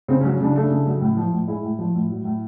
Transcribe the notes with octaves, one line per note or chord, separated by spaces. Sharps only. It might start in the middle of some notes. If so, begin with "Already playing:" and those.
C#3 C4
C#4
F#3
C#4
C#3 D4
A3 D4
C#3
F#3
A2
F3
A2
G#3 E4
A2
F3
A2
F#3
A2